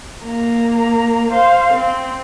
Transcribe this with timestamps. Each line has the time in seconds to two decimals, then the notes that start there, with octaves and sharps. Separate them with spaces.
0.24 A#3 A#5
1.30 C5 F5
1.74 C4